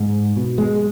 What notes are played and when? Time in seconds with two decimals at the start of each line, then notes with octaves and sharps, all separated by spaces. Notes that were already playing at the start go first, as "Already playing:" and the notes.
Already playing: G#2
0.36 B2
0.58 G#3